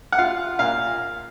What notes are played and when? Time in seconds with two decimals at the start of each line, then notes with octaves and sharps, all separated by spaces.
0.12 F#5
0.19 F4 F5
0.59 A#2 F5